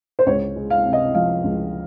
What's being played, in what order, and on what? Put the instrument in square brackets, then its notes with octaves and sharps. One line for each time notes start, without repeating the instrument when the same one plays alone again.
[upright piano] C5
C#2 C#5
G#3
F5
C3
D#5
F3 F5
C#2